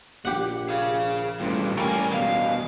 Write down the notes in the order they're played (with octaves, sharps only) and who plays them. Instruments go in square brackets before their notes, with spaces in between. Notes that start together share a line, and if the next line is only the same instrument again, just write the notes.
[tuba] A#1 [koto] G4 F#5
[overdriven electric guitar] G#4 F5
[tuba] A1 [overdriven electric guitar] G2 A#2
[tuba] A1 [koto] G3 [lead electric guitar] A3 G#5 [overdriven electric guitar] A#3 A#4
[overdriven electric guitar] E2 B2 [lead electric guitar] F5